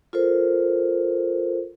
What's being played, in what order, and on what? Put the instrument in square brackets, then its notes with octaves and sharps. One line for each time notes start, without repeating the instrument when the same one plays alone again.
[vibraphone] F4 A4 A#4 C5